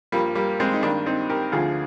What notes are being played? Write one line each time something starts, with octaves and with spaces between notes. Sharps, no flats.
G2 F3 G3 A#3
G3 A#3
G#3 C4
D#4
G2 D#3 A#3 D4
C4 D#4
G4 A#4
D2 D3 F3 F4 G#4